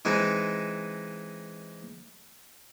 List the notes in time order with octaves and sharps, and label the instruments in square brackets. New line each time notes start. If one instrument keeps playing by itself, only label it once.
[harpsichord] E3 G#3 C4 D#4 C5